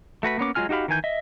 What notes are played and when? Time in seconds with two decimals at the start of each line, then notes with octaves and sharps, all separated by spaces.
0.23 A3 F#4 B4 B5
0.38 A#3 B3 C#4 D6
0.55 F#3 G#3 F4 G#5 F6
0.69 D#4 F#4 G4 F5 B5
0.88 D#3 E3 G#5 G6
1.04 D#5 E5